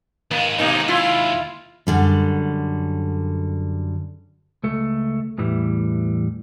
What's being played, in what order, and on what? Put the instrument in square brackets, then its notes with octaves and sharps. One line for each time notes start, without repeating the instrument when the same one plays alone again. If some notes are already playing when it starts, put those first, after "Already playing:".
[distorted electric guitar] D#2 G#3 [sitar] A#3
[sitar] B2 A#3 D#4
E4 F4
[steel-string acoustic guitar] F#2 D3 G3
[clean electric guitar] C#2 A3
E2 A2 E3 G3